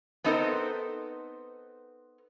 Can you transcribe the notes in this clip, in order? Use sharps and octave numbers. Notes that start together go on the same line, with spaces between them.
B3 C4 D#4 A4 A#4 C5